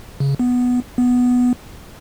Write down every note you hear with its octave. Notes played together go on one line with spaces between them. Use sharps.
C#3
B3
B3